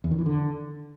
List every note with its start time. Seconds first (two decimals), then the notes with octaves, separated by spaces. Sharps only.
0.04 E2
0.11 D#3
0.19 E3
0.26 D3